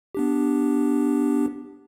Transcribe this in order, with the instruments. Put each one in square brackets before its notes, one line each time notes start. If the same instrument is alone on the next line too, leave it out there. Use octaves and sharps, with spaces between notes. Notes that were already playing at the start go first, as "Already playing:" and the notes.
[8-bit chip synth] B3 D4 G4